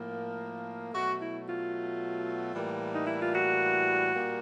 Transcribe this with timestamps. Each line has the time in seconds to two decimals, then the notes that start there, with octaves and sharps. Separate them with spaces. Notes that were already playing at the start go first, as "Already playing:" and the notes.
Already playing: A2 F3 A#3
0.93 B2 F#3 A3 F#4
1.20 E4
1.47 F4
2.53 A2 E3 G3 A#3
2.92 D#4
3.06 E4
3.19 F4
3.34 F#4
4.14 A#2 G3 A#3